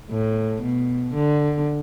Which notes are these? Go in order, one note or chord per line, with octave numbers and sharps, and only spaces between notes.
A2
B2
D3